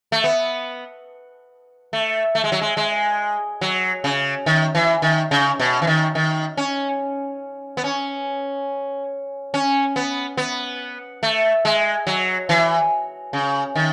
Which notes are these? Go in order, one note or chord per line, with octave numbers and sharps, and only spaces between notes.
A3
B3
A3
A3
G#3
F#3
G#3
G#3
F#3
C#3
D#3
E3
D#3
C#3
B2
E3
D#3
D#3
C#4
B3
C#4
C#4
B3
B3
A3
G#3
F#3
E3
C#3
D#3